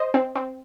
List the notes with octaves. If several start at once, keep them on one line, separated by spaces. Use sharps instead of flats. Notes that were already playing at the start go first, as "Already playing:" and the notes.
Already playing: C5 D#5
C4
C4